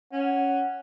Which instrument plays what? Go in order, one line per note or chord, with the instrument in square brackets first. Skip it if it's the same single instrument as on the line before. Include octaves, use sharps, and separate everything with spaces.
[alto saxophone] C#4 [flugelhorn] F#5